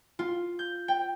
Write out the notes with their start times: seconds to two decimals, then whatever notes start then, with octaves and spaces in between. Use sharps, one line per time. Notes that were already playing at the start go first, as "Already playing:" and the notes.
0.19 F4
0.59 G6
0.88 G5